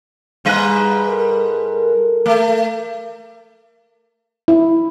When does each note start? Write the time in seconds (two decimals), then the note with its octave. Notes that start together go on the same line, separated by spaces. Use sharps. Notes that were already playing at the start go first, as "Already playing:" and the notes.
0.45 G#2 G3 B4
1.07 A4 A#4
2.26 A3
4.48 E4